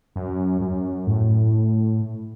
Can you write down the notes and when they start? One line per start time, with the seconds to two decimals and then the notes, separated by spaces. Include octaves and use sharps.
0.16 F#2
0.61 F#2
1.07 A2